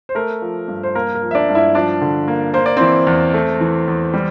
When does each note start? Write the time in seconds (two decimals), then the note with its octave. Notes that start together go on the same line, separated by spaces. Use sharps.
0.09 C5
0.15 A3 A#4
0.42 F3
0.68 G2
0.83 C5
0.95 A#3 A#4
1.15 A#4
1.22 F3
1.31 E5
1.35 D4 D5
1.49 G2
1.55 E4 E5
1.75 F3 D4 D5
2.01 D3
2.28 A#3
2.54 A#3 C5
2.66 D5
2.77 E3 C4 C5
3.07 E2
3.34 A3
3.61 E3
3.88 E2
4.14 G3